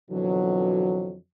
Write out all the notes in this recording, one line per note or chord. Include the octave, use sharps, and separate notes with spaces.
F2 B2 D3 E3 F#3